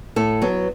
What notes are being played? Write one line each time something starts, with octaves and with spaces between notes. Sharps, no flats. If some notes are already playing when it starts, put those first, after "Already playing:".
A2 A4
F#3 B3